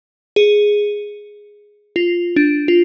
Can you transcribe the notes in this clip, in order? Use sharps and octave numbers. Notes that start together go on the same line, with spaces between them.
G#4
F4
D4
F4